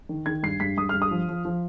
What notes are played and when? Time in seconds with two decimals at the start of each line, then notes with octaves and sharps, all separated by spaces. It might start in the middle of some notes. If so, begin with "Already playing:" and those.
0.09 D#3
0.26 D#3 G#6
0.43 G2 C7
0.60 G2 B6
0.77 G2 D#6
0.89 G2 F6
1.02 D#6
1.11 F3
1.28 F3
1.45 F3